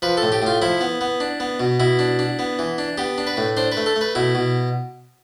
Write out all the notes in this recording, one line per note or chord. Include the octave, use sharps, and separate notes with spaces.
F3 B4
A4
A2
G4
A2 F4
F3 E4
B3
B3
D4
B3
B2
B2 E4
D4
D4
B3
E3
D4
B3 G4
D4
B4
A2
D4 C5
B4
A3
A4
A3
B4
B2 E4
B2